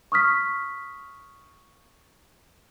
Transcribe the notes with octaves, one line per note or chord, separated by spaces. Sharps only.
C#6 D#6 F6 B6